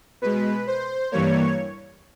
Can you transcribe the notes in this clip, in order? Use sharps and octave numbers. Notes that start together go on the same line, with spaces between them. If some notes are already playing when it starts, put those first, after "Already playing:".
B2 G#3 B4
C5
G2 E3 G3 A#3 C#5